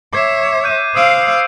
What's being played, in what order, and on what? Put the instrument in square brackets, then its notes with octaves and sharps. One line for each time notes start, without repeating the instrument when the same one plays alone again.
[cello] C#5 E5 [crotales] D6 G#6 C7
[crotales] F#6 G6 D#7
[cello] C5 F5 [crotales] D#6 E6 D7